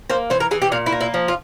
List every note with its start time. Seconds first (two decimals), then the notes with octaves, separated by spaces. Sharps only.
0.10 A#3 C5
0.30 E3 C5
0.40 A#4
0.51 E3 G#4
0.62 G4
0.72 A#2 F4
0.86 E4
0.92 A#3
1.01 E4
1.14 F3
1.28 F4